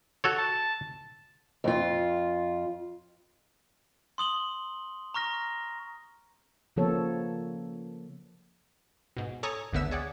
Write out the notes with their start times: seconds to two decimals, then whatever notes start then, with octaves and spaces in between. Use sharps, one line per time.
0.24 F#4 A4 C#5
0.38 A5
1.64 F2 F4
4.18 C6 D#6 F#7 G7
5.14 A#5 C#6 F6 A#6
6.76 C#3 F3 A#3 B3 A4 C#5
9.17 G#2 B2
9.43 A4 C#5 G#5 A#5 D#6
9.73 G#1 D2 D3 B3 E5 E6
9.91 G#4 C#5 D5 F#5